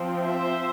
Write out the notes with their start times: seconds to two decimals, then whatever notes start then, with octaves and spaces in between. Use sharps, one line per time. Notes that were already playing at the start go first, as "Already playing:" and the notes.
Already playing: F3 C4
0.23 C5 E5